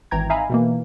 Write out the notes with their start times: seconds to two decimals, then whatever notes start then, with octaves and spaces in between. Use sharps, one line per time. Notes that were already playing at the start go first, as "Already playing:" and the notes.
0.11 G#1 E3 G5 A#5 G#6
0.30 D#4 E5 F5 G#5 A#5 B5
0.50 B2 E3 A#3